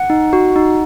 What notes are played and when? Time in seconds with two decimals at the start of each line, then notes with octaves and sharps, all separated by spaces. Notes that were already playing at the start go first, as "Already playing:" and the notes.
Already playing: F#5
0.10 D#4
0.33 F#4
0.56 D#4